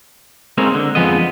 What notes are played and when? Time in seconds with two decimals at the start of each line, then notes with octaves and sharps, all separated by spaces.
0.58 G#3 A#3 C4 A#4 C#5
0.75 D3
0.95 F2 F3 G#3 B3 D#5